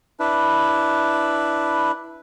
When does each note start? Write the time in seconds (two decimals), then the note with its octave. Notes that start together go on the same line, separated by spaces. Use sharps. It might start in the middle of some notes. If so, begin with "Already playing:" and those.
0.20 D4 E4 B4